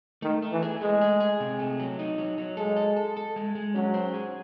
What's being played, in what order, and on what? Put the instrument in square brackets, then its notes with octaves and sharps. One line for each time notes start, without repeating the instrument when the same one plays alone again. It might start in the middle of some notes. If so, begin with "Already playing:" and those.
[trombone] D#3 [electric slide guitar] A3
[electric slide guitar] A3
[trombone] E3
[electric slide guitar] G#4
[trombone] G#3 [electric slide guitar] A3
[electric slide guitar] G#4
G#4
C3
A3
F#3
D#4
F#3
F#3
[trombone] G#3 [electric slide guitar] A4
[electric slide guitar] A4
A4
A4
G#3
G#3
[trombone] F#3 [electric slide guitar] C#4
[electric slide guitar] C5
G#4